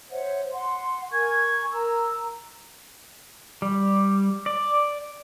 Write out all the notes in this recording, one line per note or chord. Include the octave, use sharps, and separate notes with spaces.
C5 C#5 E5 F#5
F#5 C6
A#4 G#5 C#6 G#6
A#4 A#5 E6
G3
D5